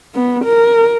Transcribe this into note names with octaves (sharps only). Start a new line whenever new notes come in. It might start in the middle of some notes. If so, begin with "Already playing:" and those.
B3
A#4